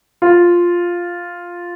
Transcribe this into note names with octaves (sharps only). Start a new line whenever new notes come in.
F4